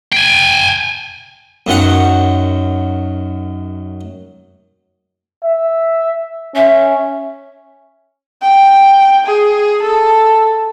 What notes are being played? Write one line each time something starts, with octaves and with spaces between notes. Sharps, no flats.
G5 G#5
F#2 D#3 F#5
E5
C#4 E5
G5
G#4
A4